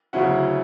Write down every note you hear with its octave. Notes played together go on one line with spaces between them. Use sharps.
D2 C#3 F#3 C#4 E4 F#5